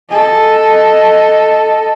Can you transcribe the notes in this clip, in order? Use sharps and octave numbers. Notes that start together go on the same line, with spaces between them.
A4 D#5